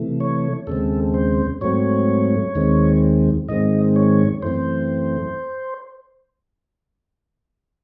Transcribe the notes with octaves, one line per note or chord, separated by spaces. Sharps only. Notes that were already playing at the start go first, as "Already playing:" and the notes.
Already playing: C3 E3 A3
C#5
D#2 C#3 G#3 C4 A4
C5
G#2 F#3 A3 C4 C#5
D#2 D#3 G#3 C4
G#2 D#3 G#3 C4 D#5
C#5
F#2 E3 A3 C4 C5